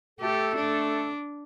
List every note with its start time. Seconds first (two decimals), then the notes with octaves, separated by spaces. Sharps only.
0.20 A3 G4 A4
0.56 D4